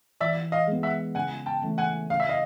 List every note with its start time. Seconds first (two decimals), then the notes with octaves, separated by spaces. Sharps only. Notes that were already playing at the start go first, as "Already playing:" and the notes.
0.21 E3 D5 E5
0.52 D#5 F5
0.67 G#3 B3
0.83 E5 F#5
1.15 C#3 F#5 G#5
1.46 G5 A5
1.62 E3 A3 C#4
1.78 F#5 G#5
2.10 C#3 F5
2.20 E5
2.29 D#5 F5